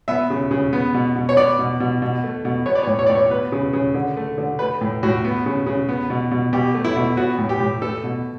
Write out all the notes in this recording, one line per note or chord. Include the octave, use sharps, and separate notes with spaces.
B3 E5
C#3
C#3
B3
B2
B2
C#5
B3 D5
B2
B2
B2
A3
B2
B3 C#5
D5
C#5
A2
C#5
A2 D5
C#5
B3 B4
C#3
C#3
D3
A3
D3
A3 B4
A2
A2 F#4
B3
C#3
C#3
B3
B2
B2
B2 G4
A3
E4
B2
B3 F#4
A2
G4
A2
A3 A4
B2